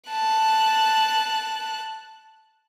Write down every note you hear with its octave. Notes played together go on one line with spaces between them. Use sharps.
A5 F#6